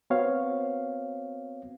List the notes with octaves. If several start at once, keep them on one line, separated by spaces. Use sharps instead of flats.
B3 C4 F#4 C#5 F5